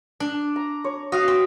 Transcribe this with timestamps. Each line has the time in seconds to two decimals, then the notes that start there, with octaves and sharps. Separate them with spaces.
0.20 D4
0.56 A#5
0.84 C#5
1.12 F#4 D#5 F5
1.28 C4